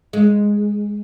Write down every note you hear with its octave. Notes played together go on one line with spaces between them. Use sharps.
G#3